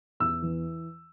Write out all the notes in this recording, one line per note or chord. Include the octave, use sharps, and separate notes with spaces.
E2 E6
E3